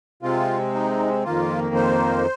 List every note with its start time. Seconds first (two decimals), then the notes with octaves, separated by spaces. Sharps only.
0.22 C3 G#3 C4 F4
0.74 D#4
1.24 F2 D#3 A#3 F4
1.75 C5